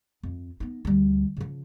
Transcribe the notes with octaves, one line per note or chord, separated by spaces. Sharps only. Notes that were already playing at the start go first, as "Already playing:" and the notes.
F2
B3 D#4
D2 G3
C#3 F3